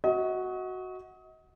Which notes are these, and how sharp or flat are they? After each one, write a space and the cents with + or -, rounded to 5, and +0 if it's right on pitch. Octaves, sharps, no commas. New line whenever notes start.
F#4 +0 D#5 +35